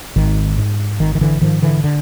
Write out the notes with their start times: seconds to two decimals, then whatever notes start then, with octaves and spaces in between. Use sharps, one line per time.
0.16 G#1 D#3
0.58 G#2
1.00 G#1 D#3
1.15 D#3
1.21 D3 E3
1.41 G#2 D#3 F3
1.62 D3 E3
1.84 D3